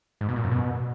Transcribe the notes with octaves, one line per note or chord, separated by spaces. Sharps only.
G#2
B2
A#2
F#2
B2